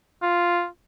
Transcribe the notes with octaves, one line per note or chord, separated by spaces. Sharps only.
F4